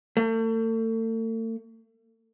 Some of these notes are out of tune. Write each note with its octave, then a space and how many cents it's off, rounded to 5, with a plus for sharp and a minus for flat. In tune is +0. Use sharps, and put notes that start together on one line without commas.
A3 +40